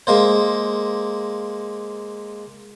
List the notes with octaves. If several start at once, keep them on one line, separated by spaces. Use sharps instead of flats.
G#3 A#3 C5